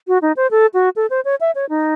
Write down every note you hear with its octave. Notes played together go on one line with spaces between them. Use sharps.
F#4
D#4
C5
A4
F#4
A4
C5
C#5
E5
C#5
D#4